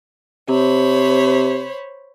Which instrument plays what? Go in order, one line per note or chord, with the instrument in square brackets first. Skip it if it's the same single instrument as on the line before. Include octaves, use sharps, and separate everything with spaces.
[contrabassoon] C3 [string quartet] C5 C#5 B5